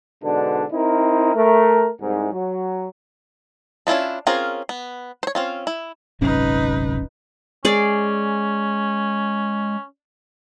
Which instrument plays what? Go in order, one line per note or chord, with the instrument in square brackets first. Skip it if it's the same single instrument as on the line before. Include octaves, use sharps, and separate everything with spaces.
[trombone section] G#2 B2 D3 D4
C4 D#4 E4 A#4
A3 A#4
C2 G#2
F#3
[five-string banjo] C#4 D4 E4 F4 A4
C4 C#4 F4 G#4 A#4
B3
C5 C#5
C4 C#4 F4
E4
[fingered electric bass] D1 G1 C#4 [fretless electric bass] C3 F#3 G#3 [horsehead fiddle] D#4 B4
[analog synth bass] G#3 [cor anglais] C#4 [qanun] G#4 D5